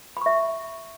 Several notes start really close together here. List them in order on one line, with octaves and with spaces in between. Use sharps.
B5 C#6 E5